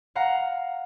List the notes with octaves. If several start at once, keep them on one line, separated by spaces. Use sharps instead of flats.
F5 F#5 A#5